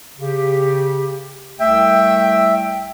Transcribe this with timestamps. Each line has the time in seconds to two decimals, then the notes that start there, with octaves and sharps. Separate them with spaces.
0.19 C#3 G4
1.60 C2 A3 E5 G5